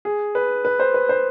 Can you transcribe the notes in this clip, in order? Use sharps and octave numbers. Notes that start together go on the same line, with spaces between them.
G#4
B4
B4
C5
B4
C5